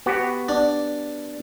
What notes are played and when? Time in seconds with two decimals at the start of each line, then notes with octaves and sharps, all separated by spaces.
0.06 B3 F#4 G4
0.49 D4